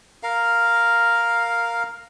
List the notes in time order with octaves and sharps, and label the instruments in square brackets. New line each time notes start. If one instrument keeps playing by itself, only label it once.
[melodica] A#4 F5